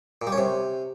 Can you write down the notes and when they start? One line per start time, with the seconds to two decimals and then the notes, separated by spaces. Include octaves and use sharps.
0.22 A#2
0.27 G3
0.32 C#4
0.38 C3